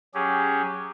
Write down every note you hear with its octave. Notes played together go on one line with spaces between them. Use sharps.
F#3 C#4 G4 G#4